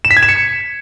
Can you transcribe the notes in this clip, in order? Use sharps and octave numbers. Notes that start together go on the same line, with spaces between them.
E7
B6
G#6
E7
C#7